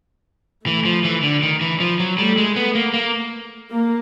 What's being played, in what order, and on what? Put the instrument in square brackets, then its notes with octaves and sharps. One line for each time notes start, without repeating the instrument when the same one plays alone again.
[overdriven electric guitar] E3 [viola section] A3
[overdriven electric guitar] F3
E3
D3
D#3
E3
F3
F#3
[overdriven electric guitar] G3 [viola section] A3
[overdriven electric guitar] G#3
B3
A#3
A#3
[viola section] A#3